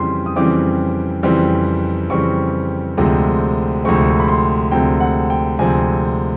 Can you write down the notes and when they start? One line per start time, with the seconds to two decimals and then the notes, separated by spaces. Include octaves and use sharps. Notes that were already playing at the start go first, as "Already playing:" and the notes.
Already playing: F2 C#3 E3 G3 C4 C6
0.26 D#6
0.36 F2 C#3 E3 G3 C4 D6
1.23 F2 C#3 E3 G3 C4
2.10 F2 C#3 E3 G3 C4 C#6
2.97 D2 C3 F3 G#3 C4
3.84 D2 C3 F3 G#3 C4 C#6
4.20 B5
4.28 C6
4.72 D2 C3 F3 G#3 C4 G5
5.00 F#5
5.30 G5
5.59 D2 C3 F3 G#3 C4 G#5